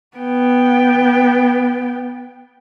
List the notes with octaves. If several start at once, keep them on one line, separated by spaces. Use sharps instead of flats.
B3 G5